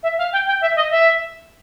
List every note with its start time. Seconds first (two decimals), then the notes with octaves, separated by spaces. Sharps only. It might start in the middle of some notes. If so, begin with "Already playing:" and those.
0.03 E5
0.18 F5
0.33 G5
0.47 G5
0.61 E5
0.76 D#5
0.90 E5